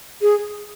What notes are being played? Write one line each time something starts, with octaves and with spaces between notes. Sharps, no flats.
G#4